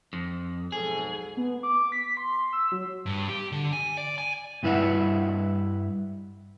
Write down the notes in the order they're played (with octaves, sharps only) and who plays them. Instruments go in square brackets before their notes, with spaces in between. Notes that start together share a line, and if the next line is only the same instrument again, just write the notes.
[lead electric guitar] F2
[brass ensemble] B1 G#2 A4 [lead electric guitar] G#4
[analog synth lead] B3
D6
B6
C6
E6
F#3
[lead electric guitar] G2
G4
D3
G#5
D5
G#5
[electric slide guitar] G2 G3 E4 B4 E5 F#5